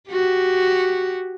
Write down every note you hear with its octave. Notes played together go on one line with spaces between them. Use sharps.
F#4 G4